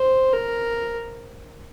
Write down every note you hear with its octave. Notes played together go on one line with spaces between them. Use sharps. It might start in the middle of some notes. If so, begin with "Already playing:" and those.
Already playing: C5
A#4